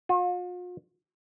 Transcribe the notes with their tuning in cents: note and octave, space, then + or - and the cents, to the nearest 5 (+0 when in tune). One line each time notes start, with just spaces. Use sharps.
F4 +45